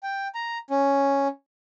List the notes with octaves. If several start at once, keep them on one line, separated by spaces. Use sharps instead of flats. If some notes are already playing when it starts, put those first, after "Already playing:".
G5
A#5
C#4